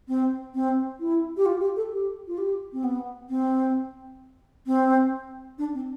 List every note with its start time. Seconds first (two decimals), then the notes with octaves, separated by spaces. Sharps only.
0.08 C4
0.54 C4
1.00 E4
1.37 G4
1.46 F4
1.61 G4
1.76 A4
1.92 G4
2.27 F4
2.38 G4
2.73 C4
2.84 B3
3.29 C4
4.67 C4
5.58 D4
5.74 C4